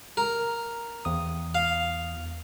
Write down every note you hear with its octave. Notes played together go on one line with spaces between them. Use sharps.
A#4
E2 D#6
F5